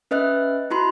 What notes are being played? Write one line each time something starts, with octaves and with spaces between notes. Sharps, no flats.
C#4 B4 D#5 E5 F#6
E4 F#4 B5 C6